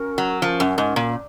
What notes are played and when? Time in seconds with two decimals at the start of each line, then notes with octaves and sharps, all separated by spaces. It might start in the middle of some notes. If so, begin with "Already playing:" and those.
Already playing: C#4 F#4 A#4
0.18 F#3
0.42 F3 C#4 F#4 A#4
0.60 F#2
0.78 G#2
0.96 A#2